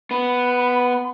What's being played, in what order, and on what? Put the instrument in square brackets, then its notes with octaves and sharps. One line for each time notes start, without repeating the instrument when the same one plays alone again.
[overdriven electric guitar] B3 [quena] B5